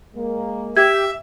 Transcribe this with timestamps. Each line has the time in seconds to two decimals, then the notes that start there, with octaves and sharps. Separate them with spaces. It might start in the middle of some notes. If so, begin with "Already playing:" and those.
0.15 G#3 A#3
0.77 G4 E5 G#6